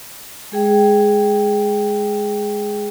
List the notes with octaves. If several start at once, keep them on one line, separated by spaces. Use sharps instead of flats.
G#3 G#4 G5